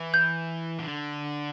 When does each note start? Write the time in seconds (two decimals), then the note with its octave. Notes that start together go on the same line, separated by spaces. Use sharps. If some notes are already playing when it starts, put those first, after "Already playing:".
Already playing: E3
0.14 G6
0.79 D3